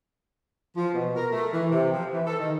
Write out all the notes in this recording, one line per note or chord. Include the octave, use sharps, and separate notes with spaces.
F3
B2
A#4
A3
E3
C3
F3
E3
A4
D#3